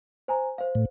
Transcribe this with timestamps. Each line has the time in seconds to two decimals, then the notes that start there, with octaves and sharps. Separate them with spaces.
0.28 C5 G#5 A#5
0.58 C5 F5
0.75 A2